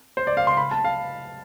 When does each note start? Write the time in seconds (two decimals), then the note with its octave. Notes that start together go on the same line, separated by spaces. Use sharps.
0.17 C5
0.27 D5
0.37 F5
0.47 C6
0.57 B5
0.71 A5
0.85 F5